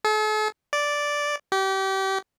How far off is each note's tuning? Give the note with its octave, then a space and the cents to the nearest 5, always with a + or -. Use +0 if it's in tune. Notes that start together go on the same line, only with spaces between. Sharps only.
A4 -45
D5 -5
G4 -30